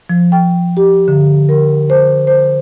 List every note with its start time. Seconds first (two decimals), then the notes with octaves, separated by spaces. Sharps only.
0.10 F3
0.32 G5
0.77 G4
1.08 D3
1.49 A#4
1.90 C5
2.27 C5